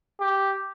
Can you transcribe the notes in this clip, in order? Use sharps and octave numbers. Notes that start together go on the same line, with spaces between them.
G4